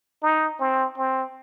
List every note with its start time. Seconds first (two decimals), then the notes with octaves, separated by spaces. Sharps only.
0.22 D#4
0.59 C4
0.98 C4